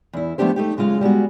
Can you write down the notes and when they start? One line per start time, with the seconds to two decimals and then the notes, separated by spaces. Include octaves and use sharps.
0.13 E2 E4
0.38 F3 A3 B3 D4 G4 C5
0.56 A3 D#4 G4
0.77 F#2 C#3 G#3 F4 F5
1.01 G3 G#3 B3 F#4